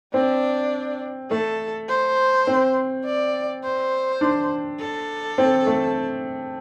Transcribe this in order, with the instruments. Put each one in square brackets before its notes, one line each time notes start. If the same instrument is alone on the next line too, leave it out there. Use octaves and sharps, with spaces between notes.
[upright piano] C4 [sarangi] D4
[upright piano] A3 [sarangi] A4
[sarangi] C5
[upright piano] C4
[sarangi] D5
C5
[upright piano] D4
[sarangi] A4
[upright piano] C4
A3